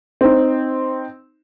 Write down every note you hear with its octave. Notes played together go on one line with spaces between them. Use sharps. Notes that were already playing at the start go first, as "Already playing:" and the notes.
C4 D#4